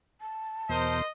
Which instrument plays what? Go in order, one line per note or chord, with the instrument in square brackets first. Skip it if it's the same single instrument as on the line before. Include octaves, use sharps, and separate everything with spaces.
[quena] A5
[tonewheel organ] E2 B2 [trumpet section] A#4 C5 [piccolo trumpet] D#5